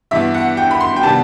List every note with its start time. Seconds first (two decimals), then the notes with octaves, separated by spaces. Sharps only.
0.11 G2 E3 B3 E5
0.34 F#5
0.57 G5
0.71 B5
0.81 C6
0.96 G5
1.03 C3 D#3 G3 B3 A5